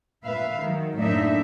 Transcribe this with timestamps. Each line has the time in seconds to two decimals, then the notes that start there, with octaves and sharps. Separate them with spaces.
0.24 A#2 B4 E5 F5
0.58 D#3 F#3
0.99 F#2 A2 A#3 D4 D#4 E5